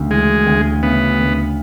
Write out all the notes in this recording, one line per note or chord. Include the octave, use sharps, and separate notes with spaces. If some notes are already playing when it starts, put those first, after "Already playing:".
Already playing: D2 C#3
E3 G#3
D2
C#3 B3
D2